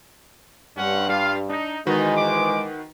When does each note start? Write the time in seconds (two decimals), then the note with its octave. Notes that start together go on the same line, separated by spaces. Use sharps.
0.77 G2 C4 C#4 F#5
1.09 G3 F4 F5
1.50 D4 D#4
1.87 G#2 D#3 E3 G#3 B3 D#4 F#4 B4
2.16 D6